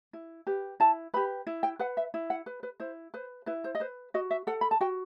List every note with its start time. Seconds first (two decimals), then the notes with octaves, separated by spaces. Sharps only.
0.13 E4
0.47 G4 B4
0.80 E4 A5
1.14 G4 B4 B5
1.47 E4
1.63 G5
1.79 B4 F#5
1.97 E5
2.14 E4
2.30 F#5
2.46 B4
2.63 B4
2.80 E4 C5
3.14 B4 C5
3.46 E4 B4
3.64 C5
3.75 D#5
3.80 B4 C5
4.14 F#4 D#5
4.31 E5
4.47 A4 F#5
4.61 B5
4.71 A5
4.81 F#4 G5